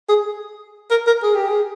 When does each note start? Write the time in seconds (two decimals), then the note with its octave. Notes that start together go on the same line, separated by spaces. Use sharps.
0.09 G#4
0.91 A#4
1.07 A#4
1.23 G#4
1.35 G4
1.48 G#4